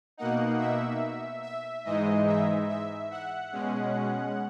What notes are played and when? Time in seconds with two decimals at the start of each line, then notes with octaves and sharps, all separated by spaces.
0.17 B2 A#3 D#4 F#5
0.59 E5
1.43 E5
1.85 G#2 E3 G#3 D#4 D#5
2.27 E5
2.69 E5
3.11 F#5
3.53 B2 G#3 C#4